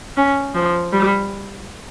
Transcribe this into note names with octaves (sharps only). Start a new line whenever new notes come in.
C#4
F3
G3